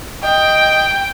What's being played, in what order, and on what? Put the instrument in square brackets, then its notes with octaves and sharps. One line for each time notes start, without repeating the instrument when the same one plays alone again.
[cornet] D#5 [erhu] G5